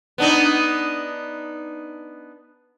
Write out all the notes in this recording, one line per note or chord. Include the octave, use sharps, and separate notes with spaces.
B3 D4 D#4